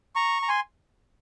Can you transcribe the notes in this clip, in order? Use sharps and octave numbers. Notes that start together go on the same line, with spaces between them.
A#5 C#6
A#5
G#5 C6